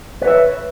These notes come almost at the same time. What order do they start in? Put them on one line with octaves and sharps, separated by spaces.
B4 C#5 E5